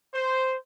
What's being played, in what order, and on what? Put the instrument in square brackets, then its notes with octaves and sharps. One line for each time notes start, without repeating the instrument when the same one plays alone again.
[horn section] C5